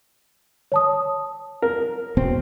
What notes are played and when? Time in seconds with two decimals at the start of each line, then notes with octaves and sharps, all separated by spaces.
0.72 C#5 A5 D#6
1.62 A#4
2.17 E1 B2 C4